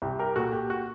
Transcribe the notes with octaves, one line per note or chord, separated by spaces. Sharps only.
C2 G4
G4 A#4
A#2 F#4 A4
G4
F#4